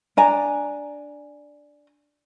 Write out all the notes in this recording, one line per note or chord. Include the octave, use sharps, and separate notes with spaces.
D4 G#5 A#5